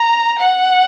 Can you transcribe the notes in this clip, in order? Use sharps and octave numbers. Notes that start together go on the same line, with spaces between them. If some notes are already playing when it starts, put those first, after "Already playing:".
Already playing: A#5
F#5